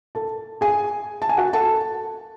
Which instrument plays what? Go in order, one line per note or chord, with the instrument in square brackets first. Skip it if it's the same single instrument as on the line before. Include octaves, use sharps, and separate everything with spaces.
[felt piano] A4 A5
G#4 G#5
A5
G#5
F#4 F#5
A4 A5